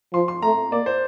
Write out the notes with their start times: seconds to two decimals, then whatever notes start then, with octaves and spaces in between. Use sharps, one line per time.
0.13 F3 C6
0.28 C6
0.42 A3 A#5
0.72 A#3 D5
0.86 C5